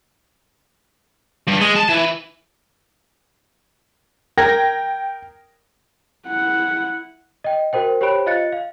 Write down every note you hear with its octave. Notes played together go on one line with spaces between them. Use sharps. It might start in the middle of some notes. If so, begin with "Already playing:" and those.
G2
G#3
A5
E3
A#4 G5 G#6 A#6
E4 F#5
D#5 G5
F#4 A#4 C5 G5
G4 C5 C#5 G5 B5 D7
F4 D#5 F5 F#6 A6 C#7
F5